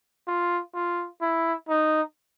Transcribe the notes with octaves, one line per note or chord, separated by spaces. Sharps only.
F4
F4
E4
D#4